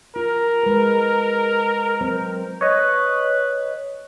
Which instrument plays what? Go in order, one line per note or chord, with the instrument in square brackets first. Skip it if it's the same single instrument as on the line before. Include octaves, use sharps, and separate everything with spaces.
[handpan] F4 [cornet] A#4
[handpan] G#3 B4
F#3 C4 C5
[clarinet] B4 [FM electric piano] C#5 D#5